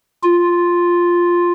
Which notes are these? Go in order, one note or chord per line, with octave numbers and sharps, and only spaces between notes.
F4